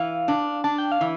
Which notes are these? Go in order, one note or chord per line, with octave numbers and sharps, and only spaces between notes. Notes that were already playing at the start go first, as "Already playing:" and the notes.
Already playing: E3 F5
D4
D4 A5
G5
F5
E3